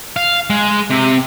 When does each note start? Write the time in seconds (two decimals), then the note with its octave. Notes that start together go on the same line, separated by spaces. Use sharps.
0.16 F5
0.50 G#3
0.91 C3